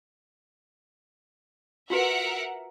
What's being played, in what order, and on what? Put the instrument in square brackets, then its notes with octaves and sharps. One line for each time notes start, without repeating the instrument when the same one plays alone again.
[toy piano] F4 F#4 B4 [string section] A#4 E5 F#5